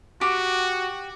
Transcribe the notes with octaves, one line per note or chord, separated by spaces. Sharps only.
F#4 G4